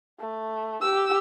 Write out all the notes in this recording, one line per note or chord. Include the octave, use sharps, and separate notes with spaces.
A3
G4 E6